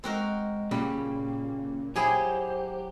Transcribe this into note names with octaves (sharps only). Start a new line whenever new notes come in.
G#3 C4 F#4 A#4
A#2 C#3 G3 A#3
F#3 E4 G4 G#4 C5 G#5